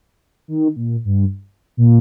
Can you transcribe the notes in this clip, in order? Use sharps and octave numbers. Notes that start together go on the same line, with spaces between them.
D#3
A#2
G2
A#2